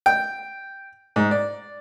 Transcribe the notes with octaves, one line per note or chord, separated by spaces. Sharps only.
G5
G#2
D5